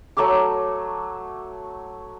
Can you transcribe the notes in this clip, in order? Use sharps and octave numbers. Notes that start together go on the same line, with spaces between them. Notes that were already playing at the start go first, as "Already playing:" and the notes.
F#3 A3 A4 D6